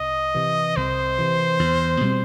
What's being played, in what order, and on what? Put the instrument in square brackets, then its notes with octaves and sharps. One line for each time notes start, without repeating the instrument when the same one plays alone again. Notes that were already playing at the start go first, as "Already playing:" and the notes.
Already playing: [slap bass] C2 [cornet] D#5
[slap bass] C3 E3
[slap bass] C2 [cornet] C5
[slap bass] C3 E3
E2
B2 G3 C4